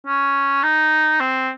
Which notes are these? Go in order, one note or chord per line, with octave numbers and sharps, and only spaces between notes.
C#4
D#4
C4